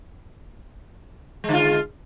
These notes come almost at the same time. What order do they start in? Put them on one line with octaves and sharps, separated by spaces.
G#3 D3 F4